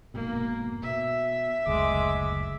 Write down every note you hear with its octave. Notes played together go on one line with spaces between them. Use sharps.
F1 G#2 B2 A#3
B2 E5
F#1 D2 G#3 D6